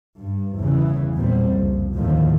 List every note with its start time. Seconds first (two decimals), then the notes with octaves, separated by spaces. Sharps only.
0.18 G2
0.56 G1 E2 C#3 E3
1.16 E2 A#2 F#3 G3 C4
1.50 F#1 C2 F2
1.93 A1 D#2 A2 D3 D#3 F3